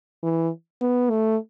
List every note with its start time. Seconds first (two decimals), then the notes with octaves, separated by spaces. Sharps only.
0.23 E3
0.81 B3
1.10 A3